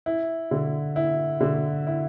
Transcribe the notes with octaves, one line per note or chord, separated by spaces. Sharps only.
E4
D3
E4
D3
E4